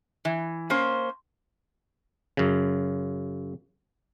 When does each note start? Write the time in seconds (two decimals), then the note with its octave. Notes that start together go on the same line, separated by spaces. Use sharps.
0.25 E3
0.70 A#3 C#4 C5
2.37 F#2 C#3